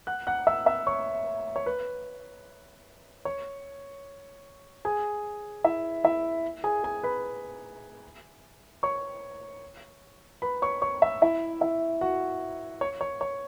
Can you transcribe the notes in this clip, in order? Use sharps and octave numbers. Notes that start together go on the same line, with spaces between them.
F#5 F#6
F#5 F#6
E5 E6
E5 E6
C#5 C#6
C#5
B4
C#5
G#4 G#5
E4 E5
E4 E5
G#4 G#5
G#4 G#5
B4 B5
C#5 C#6
B4 B5
C#5 C#6
C#5 C#6
E5 E6
E4 E5
E4 E5
F#4 F#5
C#5
C#5
C#5